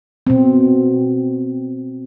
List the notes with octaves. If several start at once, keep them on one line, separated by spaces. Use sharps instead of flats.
B2 C4